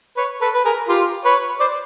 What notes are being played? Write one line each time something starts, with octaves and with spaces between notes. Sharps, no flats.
B4 C#5
A4 B4
B4
G#4 A#4
F4 G4
B4 C#5
C5 D5